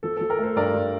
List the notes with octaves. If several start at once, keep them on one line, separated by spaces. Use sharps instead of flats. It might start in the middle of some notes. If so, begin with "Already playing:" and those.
F3 A4
F3 A4
A#4
A3 A4 C5
G2 A#4 D5
G2